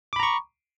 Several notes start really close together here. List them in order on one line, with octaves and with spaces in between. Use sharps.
D6 B5 A#5 C#6